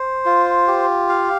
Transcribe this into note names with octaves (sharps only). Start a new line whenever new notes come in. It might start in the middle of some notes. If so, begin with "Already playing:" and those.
Already playing: C5
F4
G4
F5